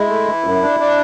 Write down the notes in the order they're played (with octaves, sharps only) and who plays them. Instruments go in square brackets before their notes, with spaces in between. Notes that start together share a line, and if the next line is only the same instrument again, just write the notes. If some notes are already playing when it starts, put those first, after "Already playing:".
Already playing: [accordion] G#3 [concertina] E4
[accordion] A3
E3
F#2
D4
D4